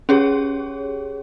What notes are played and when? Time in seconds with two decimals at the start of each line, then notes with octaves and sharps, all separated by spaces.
0.09 C#4 G4 G#4 C#5